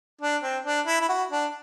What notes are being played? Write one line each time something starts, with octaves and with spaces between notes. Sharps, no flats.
D4
C4
D4
E4
E4
F#4
D4